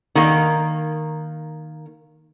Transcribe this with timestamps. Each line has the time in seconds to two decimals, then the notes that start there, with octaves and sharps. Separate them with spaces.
0.15 D#3 A#3